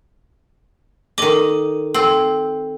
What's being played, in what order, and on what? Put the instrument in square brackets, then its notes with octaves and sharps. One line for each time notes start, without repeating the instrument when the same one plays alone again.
[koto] D#3 D#5 [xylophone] A4 D6
[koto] C4 [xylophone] A4